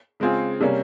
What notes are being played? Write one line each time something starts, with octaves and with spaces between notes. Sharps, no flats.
C#3 G#3 C4 F4 G#4
C3 G3 A#3 C#4